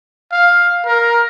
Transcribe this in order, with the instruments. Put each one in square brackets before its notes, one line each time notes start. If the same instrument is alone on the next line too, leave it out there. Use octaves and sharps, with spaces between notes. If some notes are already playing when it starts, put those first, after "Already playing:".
[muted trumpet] F5
A#4